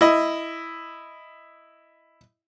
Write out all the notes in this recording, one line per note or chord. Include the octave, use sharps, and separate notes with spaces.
E4 D#5